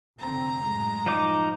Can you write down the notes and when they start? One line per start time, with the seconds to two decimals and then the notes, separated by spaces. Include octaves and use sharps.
0.20 F1 D3 C4 A#5
0.64 F#2 A2 G#3
1.06 F3 D#4 D6